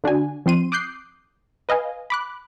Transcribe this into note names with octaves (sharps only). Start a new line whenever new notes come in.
D3 D4 F#4 G#5
F3 C4 C6 D#7
D6 D#6 F#6 G6 C7
B4 D#5 F5 G#5
B5 D6 F#6